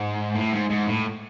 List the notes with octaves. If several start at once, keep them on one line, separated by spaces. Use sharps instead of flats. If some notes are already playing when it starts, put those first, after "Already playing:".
Already playing: G#2
A2
G#2
G#2
A2